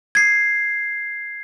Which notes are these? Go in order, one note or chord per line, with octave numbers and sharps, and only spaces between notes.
G#6 C7